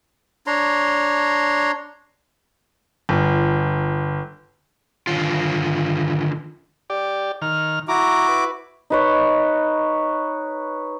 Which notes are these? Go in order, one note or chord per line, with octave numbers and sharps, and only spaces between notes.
D4 C#5 A#5 C6
G1
D3 D#3 F4
G4 D5
D#3 F6
E4 F#4 A#5 D6
B4
D#4 B4 C#5